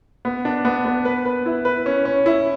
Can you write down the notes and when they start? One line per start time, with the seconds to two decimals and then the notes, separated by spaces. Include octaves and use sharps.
0.25 B3
0.45 D4
0.65 B3
0.85 B3
1.05 B4
1.25 B4
1.46 E4
1.65 B4
1.86 C#4
2.05 C#4
2.26 E4